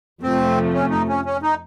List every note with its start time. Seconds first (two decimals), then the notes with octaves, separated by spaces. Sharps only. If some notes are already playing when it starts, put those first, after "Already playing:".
0.23 F2 C3 F3 A3 C4
0.74 C#4
0.90 D#4
1.09 C#4
1.25 C#4
1.42 D#4